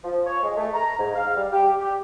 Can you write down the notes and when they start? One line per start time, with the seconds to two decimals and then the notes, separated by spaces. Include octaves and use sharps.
0.04 F3
0.26 C#5
0.43 G#3
0.56 A3
0.74 A#5
0.98 G#2
1.15 F5
1.36 G3
1.52 G4
1.80 G4